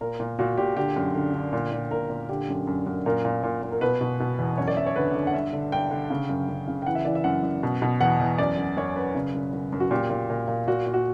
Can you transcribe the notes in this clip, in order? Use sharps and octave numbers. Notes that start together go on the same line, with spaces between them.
A#2 A#4
A#2
A#2 F#4
A#2 G4
D3 G4
F#2
D3
D3
A#2
A#2
A#2 A#4
A#2
D3 G4
F#2
F#2
F#2
A#2 A#4
A#2
A#2
A#2
A#4
B2 B4
B2
B2
E2
F#2 C#5
D5
F#2 E5
C#5
D3 B4
D3
F#5
G2 E5
D3
G2 G5
D3
C#3
F#2
F#2
C#3
G5
E3 F#5
E5
E3 D5
E5
F#2 F#5
F#2
B2
B2
E2 F#5
E2
F#2 D5
F#2
F#2 C#5
F#2 B4
C#3
F#2
F#2
F#2
F#4
A#2 G4
A#2
A#2
A#2
A#2 F#4
A#2
F#4